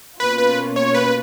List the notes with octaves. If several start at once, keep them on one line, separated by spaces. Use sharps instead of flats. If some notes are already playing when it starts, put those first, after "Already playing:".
B2 A#3 C#4 F4 B4
B4
C#5
B4